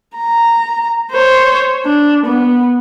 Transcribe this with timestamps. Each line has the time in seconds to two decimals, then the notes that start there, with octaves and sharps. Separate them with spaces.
0.17 A#5
1.12 C5 C#5
1.85 D4
2.26 B3